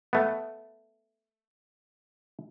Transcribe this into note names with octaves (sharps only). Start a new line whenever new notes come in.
A3 B3